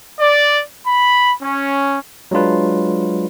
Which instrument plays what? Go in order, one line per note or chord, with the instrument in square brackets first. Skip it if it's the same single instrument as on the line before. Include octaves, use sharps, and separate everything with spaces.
[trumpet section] D5
B5
C#4
[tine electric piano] F#3 G#3 D4 F4 B4